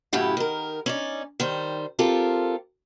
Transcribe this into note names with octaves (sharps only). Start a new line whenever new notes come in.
F#2 A2 C#3 E4 G4 F#5
D#3 A#4
C#4 D#4 D5
D#3 G3 C5
C4 F4 G4 A4 A#4